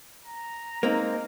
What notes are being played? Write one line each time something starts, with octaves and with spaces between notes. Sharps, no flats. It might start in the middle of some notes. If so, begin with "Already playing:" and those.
A#5
G#3 A#3 C4 D#4